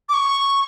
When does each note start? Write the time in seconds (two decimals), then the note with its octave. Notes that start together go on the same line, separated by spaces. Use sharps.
0.09 D6
0.14 C#6